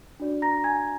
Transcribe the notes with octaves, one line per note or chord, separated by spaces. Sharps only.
D4 F#4 D5
A#5 A#6
G#5 G#6